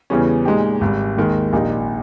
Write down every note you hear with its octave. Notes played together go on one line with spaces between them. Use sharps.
E2 C#3 E3 G3 C#4
A#2 G#3 D#4 G4
G#1 G#2 G3
D#2 D#3 G#3
A#1 A#2 A#3 D#4 G4